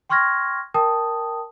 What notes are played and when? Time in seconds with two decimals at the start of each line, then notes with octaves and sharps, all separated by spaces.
0.09 G5 C6 C#6 F6 G#6 A#6
0.74 A#4 G5 A5 D#6